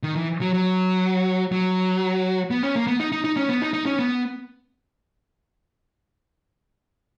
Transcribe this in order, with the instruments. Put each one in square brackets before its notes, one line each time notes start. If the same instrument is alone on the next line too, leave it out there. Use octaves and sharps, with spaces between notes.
[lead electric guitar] D#3
E3
F#3
F#3
F#3
B3
C#4
A#3
B3
D#4
D#4
D#4
C#4
B3
D#4
D#4
C#4
B3